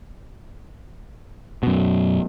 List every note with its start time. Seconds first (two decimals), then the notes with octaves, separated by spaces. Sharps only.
1.63 F#2 B2